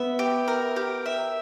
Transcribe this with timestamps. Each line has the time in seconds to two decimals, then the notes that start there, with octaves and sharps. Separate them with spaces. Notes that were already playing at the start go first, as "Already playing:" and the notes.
Already playing: B3 E5
0.19 G4
0.48 A#4
0.76 G4
1.06 E5